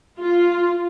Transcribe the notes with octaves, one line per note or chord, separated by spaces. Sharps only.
F4